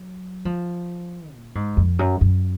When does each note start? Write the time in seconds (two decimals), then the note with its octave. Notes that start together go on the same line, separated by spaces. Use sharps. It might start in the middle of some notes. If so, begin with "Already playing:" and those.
Already playing: F#3
0.45 F3
1.33 A#2
1.55 G#2
1.77 F2
1.99 F#2
2.21 F#2